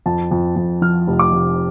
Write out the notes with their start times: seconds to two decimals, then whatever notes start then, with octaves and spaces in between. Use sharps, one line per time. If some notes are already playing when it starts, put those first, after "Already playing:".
0.06 F2 A5
0.31 F2
0.56 F2
0.82 F3 F6
1.07 F1
1.19 D6
1.33 F1